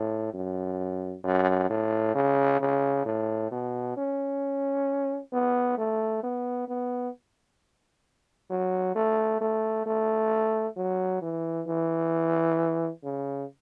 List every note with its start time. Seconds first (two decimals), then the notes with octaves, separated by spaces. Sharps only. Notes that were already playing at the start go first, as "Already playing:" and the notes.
Already playing: A2
0.34 F#2
1.24 F#2
1.70 A2
2.15 C#3
2.60 C#3
3.06 A2
3.51 B2
3.97 C#4
5.33 B3
5.78 A3
6.23 B3
6.68 B3
8.50 F#3
8.96 A3
9.41 A3
9.86 A3
10.76 F#3
11.22 E3
11.67 E3
13.04 C#3